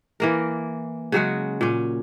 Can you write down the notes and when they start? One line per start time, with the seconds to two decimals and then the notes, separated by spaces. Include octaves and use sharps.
0.20 E3 A#3 A#4
1.12 C#3 F#3 G#3 F#4
1.61 A#2 C#4